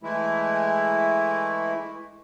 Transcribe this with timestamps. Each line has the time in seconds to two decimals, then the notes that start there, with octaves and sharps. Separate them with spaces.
0.03 E3 G#3 A3 E4